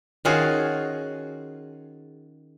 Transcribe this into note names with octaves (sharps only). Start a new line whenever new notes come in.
D#3 C#4 F4 F#4 G#4